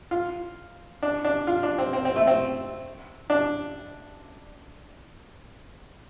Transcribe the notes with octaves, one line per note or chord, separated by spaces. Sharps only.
F4
D4
D4
F4
D4
C4
C4
C4
A3
C4
D4